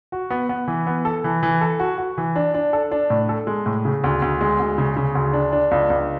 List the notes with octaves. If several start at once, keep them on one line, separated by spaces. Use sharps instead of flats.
F#4
B3
B3
E3
B3
A4
E3
E3
A4
F#4
F#4
E3
D4
D4
A4
D4
A2
A4
G#3
A2
C#3
D2
D2
G#3
D2
C#3
C#3
D2
D4
D4
C#2
C#2